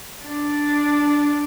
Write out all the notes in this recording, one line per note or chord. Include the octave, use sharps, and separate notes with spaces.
D4